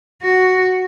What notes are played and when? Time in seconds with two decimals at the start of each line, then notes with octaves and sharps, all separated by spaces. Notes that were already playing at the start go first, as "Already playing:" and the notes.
0.22 F#4